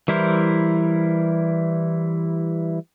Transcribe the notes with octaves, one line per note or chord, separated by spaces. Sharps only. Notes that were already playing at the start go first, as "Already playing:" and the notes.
E3 G3 E4 A#4 C5